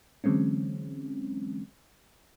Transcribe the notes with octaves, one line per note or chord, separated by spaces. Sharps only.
D3 E3 F#3 G#3 C4 C#4